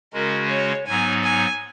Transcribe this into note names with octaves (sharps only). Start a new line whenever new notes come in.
C#3 G#3 C#4 F#4 A#4
C#5
G#2 F#3 B3 D#4 G#5
G#5